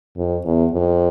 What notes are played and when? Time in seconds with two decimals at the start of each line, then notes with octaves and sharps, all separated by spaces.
0.17 F2
0.45 E2
0.72 F2